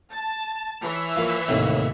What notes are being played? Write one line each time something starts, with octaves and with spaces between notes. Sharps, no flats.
A5
E3 C#5 E5
F3 A#3
D#2 A2 C3